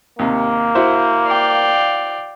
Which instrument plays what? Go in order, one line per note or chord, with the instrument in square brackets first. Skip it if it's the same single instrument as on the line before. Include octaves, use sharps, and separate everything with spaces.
[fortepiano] D#2 C3 [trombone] A#3
[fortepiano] E4 F#4 C5
[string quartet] D5 F5 G5